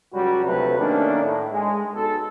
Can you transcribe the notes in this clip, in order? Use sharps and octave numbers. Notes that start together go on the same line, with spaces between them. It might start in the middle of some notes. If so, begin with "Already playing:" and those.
C#2 F#3 G3 F#4
D2 C3 F3 F#3 A3 B4
D#3 A3 A#3 C#4 D4
A2
G#3
B1 A4